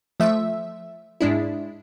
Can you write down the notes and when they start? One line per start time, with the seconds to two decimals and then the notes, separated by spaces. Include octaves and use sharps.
0.20 F3 A3 E5
1.21 G#2 G#3 D4 E4